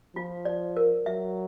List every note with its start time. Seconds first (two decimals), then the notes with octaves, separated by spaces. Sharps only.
0.16 F3 F4
0.45 D5
0.77 A#4
1.06 F#3 E5